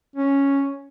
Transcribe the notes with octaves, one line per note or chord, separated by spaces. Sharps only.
C#4